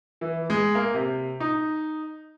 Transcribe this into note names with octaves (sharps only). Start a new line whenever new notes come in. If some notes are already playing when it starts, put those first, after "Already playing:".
E3
G#3
A#3
C3
D#4